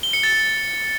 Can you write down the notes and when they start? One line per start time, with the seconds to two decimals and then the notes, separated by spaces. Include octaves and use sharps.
0.03 G7
0.13 C#7
0.23 A6